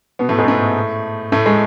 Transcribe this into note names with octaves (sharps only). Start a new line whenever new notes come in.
B2 B3
A2 A3
G#2 G#3
A2 A3
A2 A3
G#3